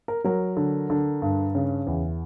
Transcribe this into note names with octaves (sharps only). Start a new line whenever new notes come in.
A#4
F#3 A#4
D3
D3
G2
C#3
E2